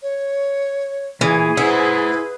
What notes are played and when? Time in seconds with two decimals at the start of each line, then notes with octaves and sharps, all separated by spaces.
0.02 C#5
1.21 A#2 E3 G#4
1.57 E4 B4 C5 F#5